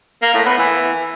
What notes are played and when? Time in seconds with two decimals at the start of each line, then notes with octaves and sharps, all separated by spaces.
0.22 A#3
0.34 A2
0.46 B3
0.58 E3